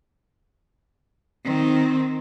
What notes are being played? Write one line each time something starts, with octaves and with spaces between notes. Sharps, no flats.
D#3 C4